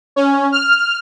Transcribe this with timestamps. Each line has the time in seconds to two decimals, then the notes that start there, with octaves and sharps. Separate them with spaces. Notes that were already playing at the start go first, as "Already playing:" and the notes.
0.16 C#4
0.52 F6